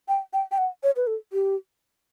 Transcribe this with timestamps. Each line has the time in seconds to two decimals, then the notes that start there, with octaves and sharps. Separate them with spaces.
0.08 G5
0.33 G5
0.52 G5
0.58 F#5
0.83 C#5
0.96 B4
1.07 A4
1.33 G4